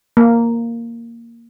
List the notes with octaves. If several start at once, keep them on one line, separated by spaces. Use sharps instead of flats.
A#3